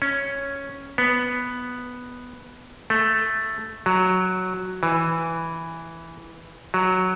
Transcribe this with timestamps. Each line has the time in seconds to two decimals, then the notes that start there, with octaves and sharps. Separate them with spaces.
0.02 C#4
0.98 B3
2.90 A3
3.86 F#3
4.83 E3
6.74 F#3